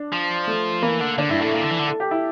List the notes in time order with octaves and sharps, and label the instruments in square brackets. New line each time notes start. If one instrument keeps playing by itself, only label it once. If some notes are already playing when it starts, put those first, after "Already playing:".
Already playing: [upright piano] D4
[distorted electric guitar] F3
[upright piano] A3
[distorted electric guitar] E3 [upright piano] A#3
[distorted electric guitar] D3
[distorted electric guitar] D3 [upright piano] D4
[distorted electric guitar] G2 [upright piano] E4
[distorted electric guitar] A2 [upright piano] A4
[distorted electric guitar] A#2
D3
E3
D3
[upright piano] A4
G4
E4